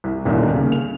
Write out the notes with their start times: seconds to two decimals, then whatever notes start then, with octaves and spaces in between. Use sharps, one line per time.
0.04 C2
0.25 D#1 C2 B2 D3 D#3
0.54 C#3 A#3
0.72 F7